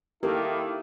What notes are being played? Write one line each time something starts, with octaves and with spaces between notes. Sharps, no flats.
D#3 A#3 E4 G4 A4